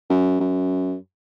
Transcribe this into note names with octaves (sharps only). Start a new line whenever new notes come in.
F#2
F#2